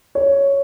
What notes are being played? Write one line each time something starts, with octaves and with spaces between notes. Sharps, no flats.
C#5